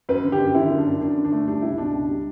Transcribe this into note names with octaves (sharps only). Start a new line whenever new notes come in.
F#2 B4
D3
G4
F#2
D3 E4
F#2
D4
F#2
F#2 D4
D3
D4
A3
G3 D4
C#2 E4
B2 D4
C#2
G3